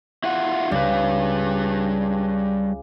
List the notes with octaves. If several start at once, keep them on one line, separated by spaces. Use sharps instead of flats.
E4 F4 F#5
C#2 G3 B4